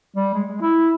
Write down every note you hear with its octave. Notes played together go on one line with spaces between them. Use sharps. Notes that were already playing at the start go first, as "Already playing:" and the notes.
G3
G#3
G#3
E4